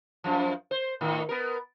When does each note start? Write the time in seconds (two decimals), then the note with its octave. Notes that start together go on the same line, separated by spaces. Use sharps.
0.24 F#2 F3
0.71 C5
1.01 A2 D#3
1.29 B3 A#4